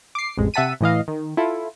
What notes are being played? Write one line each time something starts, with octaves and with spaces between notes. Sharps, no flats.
D6 C7
A1 F2 G#3
C3 E5 F#5 A5 B6 D#7
A2 E3 D#5 F5
D#3
E4 F4 A4